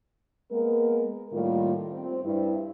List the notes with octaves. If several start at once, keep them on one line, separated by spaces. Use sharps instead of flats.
G#3 A#3 B3 A#4
A2 D#3 G3 A#3 F4
C4
G2 E4